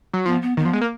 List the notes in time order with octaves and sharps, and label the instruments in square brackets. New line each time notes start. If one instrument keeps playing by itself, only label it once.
[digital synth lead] F#3
[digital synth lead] F3 [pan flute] B3
[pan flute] B3
[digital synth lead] D#3 [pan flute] B3
[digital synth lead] F3
G#3
A#3